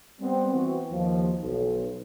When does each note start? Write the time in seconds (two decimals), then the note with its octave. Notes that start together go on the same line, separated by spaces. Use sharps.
0.21 G3 B3 C4
0.54 E3 F#4
0.91 D#2 F3
1.43 B1